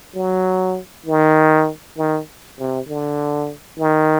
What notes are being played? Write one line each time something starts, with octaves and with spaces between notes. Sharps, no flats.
F#3
D#3
D#3
C3
D3
D#3